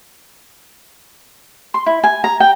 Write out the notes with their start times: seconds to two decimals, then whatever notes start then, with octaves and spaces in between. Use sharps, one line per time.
1.74 C6
1.86 E4
2.04 G#5
2.24 A#5
2.40 G5